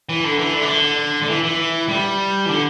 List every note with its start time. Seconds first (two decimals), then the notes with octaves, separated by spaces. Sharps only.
0.09 E3
0.24 D3
0.39 E3
0.54 D3
0.62 E3
0.69 D3
1.22 D3
1.29 E3
1.43 E3
1.89 G3
2.45 E3
2.49 D3